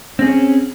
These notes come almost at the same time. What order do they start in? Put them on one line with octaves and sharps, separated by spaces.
C4 G#4 C#4